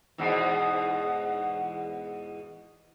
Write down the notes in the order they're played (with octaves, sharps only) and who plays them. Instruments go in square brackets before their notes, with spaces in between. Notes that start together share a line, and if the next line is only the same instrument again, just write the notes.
[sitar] E2 G#2 B2